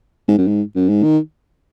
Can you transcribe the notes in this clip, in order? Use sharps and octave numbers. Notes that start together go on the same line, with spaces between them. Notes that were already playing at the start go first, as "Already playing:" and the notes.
G#2
F#2
G#2
F#2
G#2
D#3